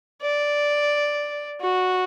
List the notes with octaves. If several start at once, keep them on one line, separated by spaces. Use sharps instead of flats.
D5
F#4